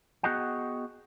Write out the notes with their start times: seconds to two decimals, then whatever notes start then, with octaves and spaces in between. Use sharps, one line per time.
0.23 B3 F#4 G#4 D#5 F#5 G5